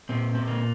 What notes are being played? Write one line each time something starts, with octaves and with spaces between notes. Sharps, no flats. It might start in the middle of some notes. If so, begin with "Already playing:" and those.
A#2 C4
C4
A#3